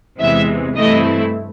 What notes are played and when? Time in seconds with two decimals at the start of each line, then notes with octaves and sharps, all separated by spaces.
0.19 E2 C3 E3 G#3 E5
0.75 G2 E3 A3 C4 E4 D#5